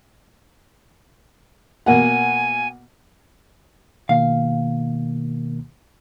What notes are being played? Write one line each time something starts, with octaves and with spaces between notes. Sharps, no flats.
B2 A#3 F#5 G#5
B2 D#3 A#3 F5